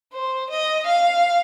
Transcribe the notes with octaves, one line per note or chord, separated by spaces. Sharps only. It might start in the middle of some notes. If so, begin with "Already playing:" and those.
C5
D#5
F5